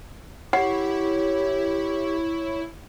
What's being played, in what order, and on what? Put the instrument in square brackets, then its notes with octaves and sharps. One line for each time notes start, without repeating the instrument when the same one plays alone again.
[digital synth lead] E4 [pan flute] G4 [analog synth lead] C#5 [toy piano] F#5